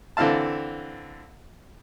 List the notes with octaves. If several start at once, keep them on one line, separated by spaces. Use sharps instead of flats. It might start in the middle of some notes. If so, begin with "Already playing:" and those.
D3 E3 C4 F5 A5